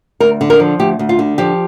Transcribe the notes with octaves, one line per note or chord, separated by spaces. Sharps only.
D2 A#4
D3
A#4
F3
D2 G4
D2
F4
D3
F3 G4